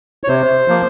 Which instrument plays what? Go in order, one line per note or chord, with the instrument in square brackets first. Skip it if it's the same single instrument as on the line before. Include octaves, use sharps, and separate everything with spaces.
[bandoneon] C#5
C3 C5
F3 A#3